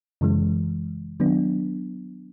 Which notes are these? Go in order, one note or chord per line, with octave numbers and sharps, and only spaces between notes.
F#2 C#3 E3 G#3
D#3 F#3 B3 D4